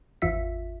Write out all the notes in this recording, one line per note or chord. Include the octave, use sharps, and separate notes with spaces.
G#1 E2 F4 E5 B6